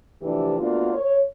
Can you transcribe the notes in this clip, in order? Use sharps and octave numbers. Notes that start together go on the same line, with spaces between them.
D2 C3 E3 F3 D4 G4
D2 A#3 B3 D4 F4 F#4
C#5